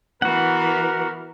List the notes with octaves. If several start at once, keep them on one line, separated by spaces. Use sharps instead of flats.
E3 B3 F#4 A#4 F#5